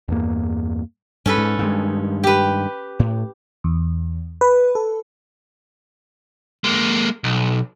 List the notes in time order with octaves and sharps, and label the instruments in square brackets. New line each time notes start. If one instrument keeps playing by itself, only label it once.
[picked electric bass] E2 G2 A#3
[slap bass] G2 [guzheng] C#4 A4 B4
[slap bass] G#2
G2 D#3 G#3
[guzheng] G4 B4
[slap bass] A2
[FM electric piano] E2
B4
A4
[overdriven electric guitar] G#3 A#3
B1